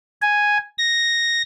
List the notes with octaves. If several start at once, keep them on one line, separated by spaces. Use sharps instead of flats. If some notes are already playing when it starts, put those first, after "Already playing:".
G#5
A#6